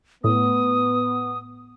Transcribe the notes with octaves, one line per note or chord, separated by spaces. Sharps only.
A2 B3 D#6